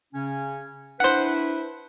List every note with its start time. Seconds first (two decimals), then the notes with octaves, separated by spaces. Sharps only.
0.14 C#3 C#4
1.00 D4 E4 B4 C5 F#5